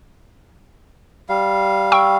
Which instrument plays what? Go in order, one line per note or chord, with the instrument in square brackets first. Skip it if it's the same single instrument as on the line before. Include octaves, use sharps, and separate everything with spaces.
[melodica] G3 F5
[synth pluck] G5 C#6 E6